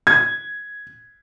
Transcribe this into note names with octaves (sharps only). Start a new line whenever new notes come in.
G#6